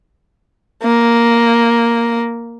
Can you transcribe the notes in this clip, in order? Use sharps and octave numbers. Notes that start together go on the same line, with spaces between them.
A#3